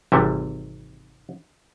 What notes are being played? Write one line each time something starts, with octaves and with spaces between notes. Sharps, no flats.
G#1 C3 E3 G3 E5